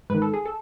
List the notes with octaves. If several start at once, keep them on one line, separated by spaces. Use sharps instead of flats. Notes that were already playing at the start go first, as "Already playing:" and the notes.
G#2 D#3 B4
A4
G#4
A4